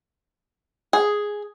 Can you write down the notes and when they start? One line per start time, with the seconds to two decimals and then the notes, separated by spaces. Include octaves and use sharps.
0.93 G#4